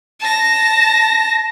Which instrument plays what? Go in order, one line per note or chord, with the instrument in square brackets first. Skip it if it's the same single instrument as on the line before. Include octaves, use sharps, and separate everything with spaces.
[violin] A5 A#6